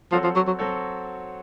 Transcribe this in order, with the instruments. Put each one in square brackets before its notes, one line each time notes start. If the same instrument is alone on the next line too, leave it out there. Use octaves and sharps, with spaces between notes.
[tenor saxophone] F3 [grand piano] F#3 C4 F#4 A4 C#5
[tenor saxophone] F3
F#3
F#3
[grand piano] F#3 C4 F#4 A4 C#5